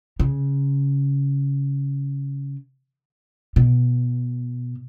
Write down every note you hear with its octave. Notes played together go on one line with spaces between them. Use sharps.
C#3
B2